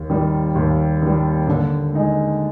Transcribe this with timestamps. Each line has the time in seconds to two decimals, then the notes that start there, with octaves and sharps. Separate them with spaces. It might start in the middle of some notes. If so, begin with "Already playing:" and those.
Already playing: D#2
0.10 D#3 G3
0.55 D#2
1.02 D#3 G3
1.48 D3
1.93 G#3 D#4 G#4